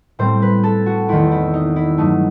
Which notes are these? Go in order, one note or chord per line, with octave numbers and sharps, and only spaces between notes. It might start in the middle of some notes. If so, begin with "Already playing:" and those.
A2 G3 C4 C5
B4
A4
F#4
E2 D#3 A3 C4 E4
E4
D#4
E4
G2 F#3 A3 D#4